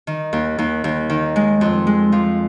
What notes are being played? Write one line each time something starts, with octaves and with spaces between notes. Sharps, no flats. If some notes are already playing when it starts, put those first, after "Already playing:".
D#3
D#2
D#2
D#2
D#3
G#3
F2
G#3
F3